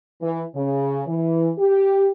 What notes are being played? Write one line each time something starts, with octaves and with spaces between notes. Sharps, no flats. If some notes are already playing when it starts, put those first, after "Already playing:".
E3
C#3
E3
G4